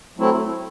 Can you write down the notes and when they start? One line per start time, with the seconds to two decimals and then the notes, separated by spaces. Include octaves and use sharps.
0.17 F#3 A3 C4 E4